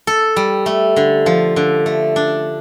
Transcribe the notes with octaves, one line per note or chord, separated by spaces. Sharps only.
A4
G3
A3
D3
F3
D3
A3
D4